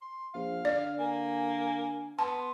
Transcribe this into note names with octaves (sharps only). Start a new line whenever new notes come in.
C6
A#1 F5
D3 D5
A#3 G#5
B3 A5 C6